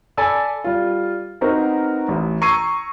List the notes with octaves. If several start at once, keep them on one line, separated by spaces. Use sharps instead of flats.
A4 D5 G#5 A5 B5 E6
G3 F4
B3 C4 D#4 F#4 A#4 C5
A1
A#5 C#6 E6 G#6 C7 D#7